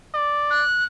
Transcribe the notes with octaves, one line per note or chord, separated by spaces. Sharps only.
D5
F#6